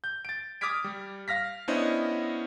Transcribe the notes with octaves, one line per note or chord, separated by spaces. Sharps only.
G6
A6 D7
D6 D#6 F6 G#6 B6 D7
G3
F5 F6 A#6 B6
B3 C#4 D4 E4 C5 D#5